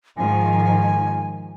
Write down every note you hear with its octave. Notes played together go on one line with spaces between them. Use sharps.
G#2 D#3 F3 G#5